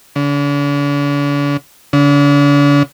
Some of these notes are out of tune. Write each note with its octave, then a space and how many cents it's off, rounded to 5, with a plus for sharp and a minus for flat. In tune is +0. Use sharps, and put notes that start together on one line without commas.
D3 -45
D3 -45